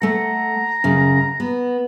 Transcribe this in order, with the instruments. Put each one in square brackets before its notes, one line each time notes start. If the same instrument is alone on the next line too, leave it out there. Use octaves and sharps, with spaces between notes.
[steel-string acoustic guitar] A3 F#5 [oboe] A#5
[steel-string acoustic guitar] F#2 C#3
B3